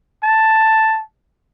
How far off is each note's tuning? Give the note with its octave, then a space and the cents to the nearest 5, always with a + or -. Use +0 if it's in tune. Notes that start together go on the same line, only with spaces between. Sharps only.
A5 +5